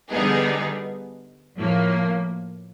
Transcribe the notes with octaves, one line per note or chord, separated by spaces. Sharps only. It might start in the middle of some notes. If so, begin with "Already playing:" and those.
D3 G3 B3 D#4 G#4
A2 F3 A#3